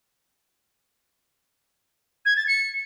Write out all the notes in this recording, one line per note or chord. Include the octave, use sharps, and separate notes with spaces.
G#6
A6
C#7